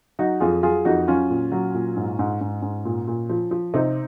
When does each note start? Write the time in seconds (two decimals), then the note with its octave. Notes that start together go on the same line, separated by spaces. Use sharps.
0.19 F#3 D#4 F#4
0.40 F2 F4 G#4
0.63 F#3 F4 G#4
0.85 F2 D#4 F#4
1.08 F#3 C#4 F4
1.30 A#2
1.52 F#3
1.74 A#2
1.96 G#2
2.19 G#2
2.41 G#2
2.62 G#2
2.85 A#2
3.07 A#2
3.30 F3
3.51 F3
3.74 C3 C4 D#4